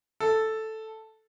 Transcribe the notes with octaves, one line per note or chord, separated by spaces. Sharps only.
A4